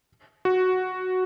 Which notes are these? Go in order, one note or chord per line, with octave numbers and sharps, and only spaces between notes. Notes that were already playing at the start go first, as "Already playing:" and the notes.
F#4